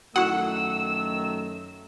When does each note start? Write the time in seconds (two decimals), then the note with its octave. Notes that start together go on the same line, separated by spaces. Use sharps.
0.16 F#2 D#3 A3 E4 F#4 F#5 E6